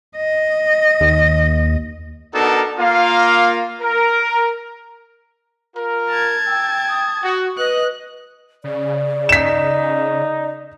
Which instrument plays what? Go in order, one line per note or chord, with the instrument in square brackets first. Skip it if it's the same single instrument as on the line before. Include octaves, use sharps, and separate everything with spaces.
[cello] D#5
[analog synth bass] D#2
[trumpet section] B3 D4 D#4 F#4 A4 A#4
A#3 F4 F5
A#4
F4 A#4
[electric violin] A5 G#6
[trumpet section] G5 [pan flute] E6
[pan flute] D#6
[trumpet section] F#4
[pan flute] B4 [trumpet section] D#5 [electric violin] F#6
[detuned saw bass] C#3 [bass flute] D5
[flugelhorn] D#4 [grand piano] B6 E7